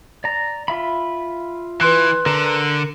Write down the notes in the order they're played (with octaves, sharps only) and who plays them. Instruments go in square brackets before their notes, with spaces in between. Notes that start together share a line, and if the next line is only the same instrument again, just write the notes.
[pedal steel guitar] D5 A#5
F4 E5 B5
[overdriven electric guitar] E3 [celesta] B4 C6 F#6
[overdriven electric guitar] D3 [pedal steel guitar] A#4 A#5